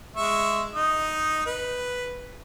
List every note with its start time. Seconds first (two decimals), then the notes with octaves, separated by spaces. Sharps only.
0.16 G#3 E5 C#6
0.74 D#4 D#6
1.46 B4